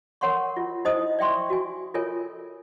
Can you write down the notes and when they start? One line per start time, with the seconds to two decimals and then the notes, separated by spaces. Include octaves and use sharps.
0.21 A#4 C#5 F#5 C6 C#6
0.57 F4
0.85 D#4 E4 C5 D#5 D#6
1.19 D5 E5 G5 C6 C#6
1.50 F#4 G#5
1.94 F4 A4 A#4 C#5 G#5